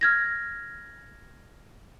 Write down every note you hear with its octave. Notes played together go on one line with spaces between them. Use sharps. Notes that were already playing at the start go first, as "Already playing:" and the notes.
F6 G#6 A#6